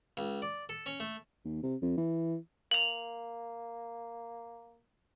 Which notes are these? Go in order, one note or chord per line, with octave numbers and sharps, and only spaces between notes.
C#2
D5
A4
C#4
A3
D#2
C3
F2
E3
A#3 F7 F#7